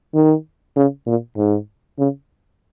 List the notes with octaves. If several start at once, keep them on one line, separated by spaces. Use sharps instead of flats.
D#3
C#3
A#2
G#2
C#3